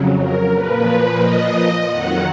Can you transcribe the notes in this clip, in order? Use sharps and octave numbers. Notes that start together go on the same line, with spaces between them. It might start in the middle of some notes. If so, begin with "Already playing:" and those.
Already playing: F2 C#3 F#3
A#4
A#2 F3 B4
D#5
F2 D#3 F#3 F#5